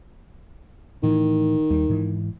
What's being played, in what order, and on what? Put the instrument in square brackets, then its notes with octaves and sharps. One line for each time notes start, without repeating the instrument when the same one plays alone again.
[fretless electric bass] A2 E3 [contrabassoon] D#3
[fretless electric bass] D#2 G3
G#2 E3